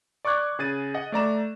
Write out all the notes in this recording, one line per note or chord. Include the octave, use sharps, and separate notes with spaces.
D5 C#6 D6 F#6 G#6
C#3 G#4 A6 D#7
D#5 F#5
A3 D5 A#5 E7